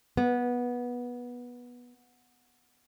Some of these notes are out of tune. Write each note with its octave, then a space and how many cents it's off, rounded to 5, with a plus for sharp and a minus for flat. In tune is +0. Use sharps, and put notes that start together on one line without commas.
B3 -15